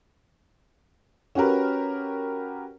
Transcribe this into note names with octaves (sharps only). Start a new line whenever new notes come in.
C#4 F#4 G4 A#4 B4